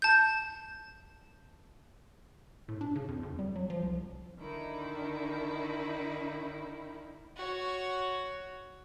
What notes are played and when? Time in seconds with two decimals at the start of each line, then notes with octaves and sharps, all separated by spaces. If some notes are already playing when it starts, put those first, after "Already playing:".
0.02 A5 G6
2.68 A2
2.81 D4
2.95 C#3
3.08 F2
3.23 F2
3.39 G3
3.56 F#3
3.70 F3
3.83 C2
4.39 D3 D#3 D#4 E4
7.36 F#4 C#5